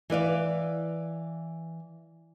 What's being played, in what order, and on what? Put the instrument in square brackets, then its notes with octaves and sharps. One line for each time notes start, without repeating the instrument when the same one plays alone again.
[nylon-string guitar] E3 B4 D5 F5